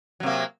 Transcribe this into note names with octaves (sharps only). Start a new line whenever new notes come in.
C3 F#3 A#3